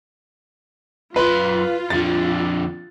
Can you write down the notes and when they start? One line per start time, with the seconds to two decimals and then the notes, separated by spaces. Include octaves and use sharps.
1.16 F#2 F4 B4 C6
1.90 F2 D3 A6